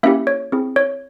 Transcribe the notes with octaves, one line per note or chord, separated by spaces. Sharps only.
A#3 C#4 E4 G4 E5
C#5
C4 E4 G#4
C#5